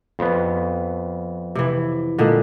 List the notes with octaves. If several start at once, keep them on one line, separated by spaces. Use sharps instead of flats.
F2 B3
C3 E3
A#2 D3 G#3